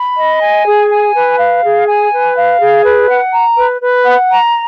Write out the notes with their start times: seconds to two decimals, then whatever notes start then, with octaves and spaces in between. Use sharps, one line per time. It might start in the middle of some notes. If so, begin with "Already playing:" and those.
Already playing: B5
0.16 D#5
0.40 G#5
0.64 G#4
0.89 G#5
1.13 B4
1.37 F5
1.62 G#4
1.86 G#5
2.11 B4
2.35 F5
2.59 G#4
2.84 B4
3.08 F#5
3.32 A#5
3.56 B4
3.81 B4
4.05 F#5
4.30 A#5